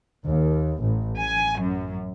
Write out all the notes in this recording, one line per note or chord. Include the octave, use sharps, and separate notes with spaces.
D#2
A1
G#5
F#2